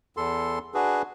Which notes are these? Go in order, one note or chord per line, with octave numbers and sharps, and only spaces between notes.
E2 A4 C6
D4 F#4 G#4 B4